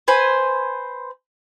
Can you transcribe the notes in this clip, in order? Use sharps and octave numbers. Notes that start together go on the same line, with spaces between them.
B4 C5 G#5